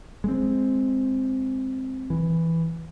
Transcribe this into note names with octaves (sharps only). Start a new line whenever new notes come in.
G#3 C4
E3